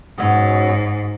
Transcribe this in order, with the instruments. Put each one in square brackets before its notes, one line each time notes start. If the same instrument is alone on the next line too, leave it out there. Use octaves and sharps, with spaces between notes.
[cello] G#2 [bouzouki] B2 F#3 C#4